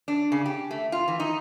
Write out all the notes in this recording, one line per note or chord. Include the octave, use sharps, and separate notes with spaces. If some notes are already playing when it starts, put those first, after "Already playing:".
D4
C#3
G4
A3
F4
E3
D#4